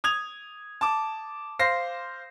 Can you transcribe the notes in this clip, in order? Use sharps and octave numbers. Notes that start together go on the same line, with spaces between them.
D#6 G#6 F7
A5 D6
C5 F5 A#6 C7